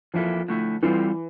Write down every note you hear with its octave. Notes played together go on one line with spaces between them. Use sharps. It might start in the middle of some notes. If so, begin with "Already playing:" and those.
F2 E3 F3 A#3 E4 A4
D3 A3 E4
E3 G3 C4 F4 A4 C5